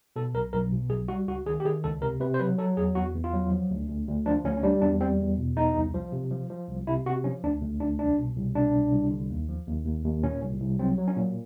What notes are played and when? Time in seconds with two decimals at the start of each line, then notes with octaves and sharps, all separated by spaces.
0.16 B2 A4
0.34 B1 A#4
0.53 B1 A#4
0.72 B2
0.90 B1 G#4
1.08 G3 F#4
1.28 C#2 F#4
1.46 D#3 G#4
1.60 G4
1.65 D#3 G#4
1.84 C#2 A4
2.02 C3 A#4
2.20 C3 B4
2.34 C5
2.40 F#3 B4
2.58 F#3 A4
2.77 E2 G#4
2.95 E2 F#4
3.15 E2
3.24 F4
3.33 F#3
3.51 F3
3.71 D2
3.89 D2
4.08 D2
4.26 F3 D4
4.45 D2 C#4
4.57 C#4
4.63 G3 D4
4.82 E2 D4
5.01 G3 C4
5.19 E2
5.38 B2
5.56 E2 D#4
5.75 C2
5.94 F3
6.12 C3
6.31 F3
6.50 F3
6.69 C2
6.87 C3 E4
7.06 C3 F#4
7.24 F3 C#4
7.44 D2 D4
7.62 D2
7.80 D2 D4
7.99 C2 D4
8.18 B2
8.36 C2
8.55 B2 D4
8.74 C2
8.92 C2
9.11 D3
9.30 D#2
9.49 F3
9.67 D#2
9.86 D#2
10.04 D#2
10.23 A#2 C#4
10.42 C2
10.61 C2
10.79 F#3 C4
10.98 F#3
11.08 C#4
11.16 A#2